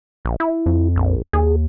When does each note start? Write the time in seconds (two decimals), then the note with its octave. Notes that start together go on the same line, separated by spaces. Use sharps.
0.25 A#1
0.40 E4
0.66 F2
0.96 A#1
1.33 D#2 G#4